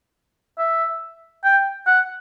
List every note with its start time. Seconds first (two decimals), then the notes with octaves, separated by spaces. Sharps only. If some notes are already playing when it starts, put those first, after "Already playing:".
0.58 E5
1.44 G5
1.87 F#5